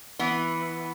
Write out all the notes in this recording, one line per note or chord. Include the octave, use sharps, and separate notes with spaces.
E3 B3